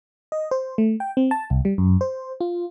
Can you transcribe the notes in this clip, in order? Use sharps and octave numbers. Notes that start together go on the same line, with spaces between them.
D#5
C5
A3
G5
C4
A5
C2
G3
F#2
C5
F4